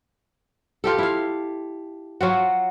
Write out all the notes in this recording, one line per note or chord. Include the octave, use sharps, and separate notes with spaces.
F4 G4 A4
E4 F5
F#3 F4 F#4